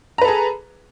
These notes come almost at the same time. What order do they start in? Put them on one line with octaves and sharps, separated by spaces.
A#5 B4 A4 G#4